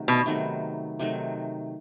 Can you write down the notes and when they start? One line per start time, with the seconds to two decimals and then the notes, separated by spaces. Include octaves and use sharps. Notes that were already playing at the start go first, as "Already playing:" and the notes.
Already playing: C3 D#3 F#3 A3
0.08 B2
0.26 C3 D#3 F#3 A3
0.99 C3 D#3 F#3 A3